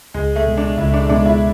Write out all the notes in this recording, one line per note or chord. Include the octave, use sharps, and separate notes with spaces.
C#2 G#3
A3
B2 G#3
D4
C#2 E4
D4
B2 G#3 D4
E4